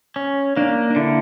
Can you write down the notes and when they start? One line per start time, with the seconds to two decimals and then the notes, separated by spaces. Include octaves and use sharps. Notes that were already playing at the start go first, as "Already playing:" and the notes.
0.16 C#4
0.56 A#3 D4
0.90 D4
0.96 D3 E4